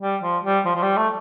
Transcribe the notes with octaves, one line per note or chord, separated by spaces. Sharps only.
G3
F3
G3
F3
F3
G3
A3